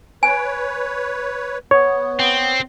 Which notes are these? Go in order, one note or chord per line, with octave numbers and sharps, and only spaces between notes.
B4 C#5 G#5
B3 C#5
C4